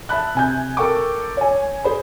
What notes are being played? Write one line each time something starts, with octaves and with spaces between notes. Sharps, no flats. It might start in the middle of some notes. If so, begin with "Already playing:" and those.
E5 A5 B5 F#6
C3 G#5 G6
A4 A#4 G5 C#6 D6
C#5 G#5
G#4 C5 B5